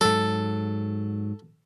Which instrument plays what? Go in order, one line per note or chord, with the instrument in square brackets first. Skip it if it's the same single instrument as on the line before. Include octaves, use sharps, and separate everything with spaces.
[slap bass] G#2 F#3 [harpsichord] A4